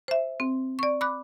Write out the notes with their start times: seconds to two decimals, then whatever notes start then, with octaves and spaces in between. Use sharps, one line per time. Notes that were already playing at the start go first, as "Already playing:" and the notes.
0.08 C5 E5
0.40 C4
0.79 D5 C#6
1.01 B5 D6 F#6